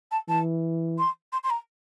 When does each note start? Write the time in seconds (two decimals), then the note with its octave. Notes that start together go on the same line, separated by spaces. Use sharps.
0.11 A5
0.28 E3 A5
0.98 C6
1.32 C6
1.43 C6
1.50 A#5